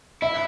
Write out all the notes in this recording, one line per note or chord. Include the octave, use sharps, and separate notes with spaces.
E4 E5